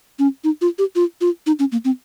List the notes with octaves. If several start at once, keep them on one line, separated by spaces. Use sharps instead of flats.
C#4
D#4
F4
G4
F4
F4
D#4
C#4
A#3
C4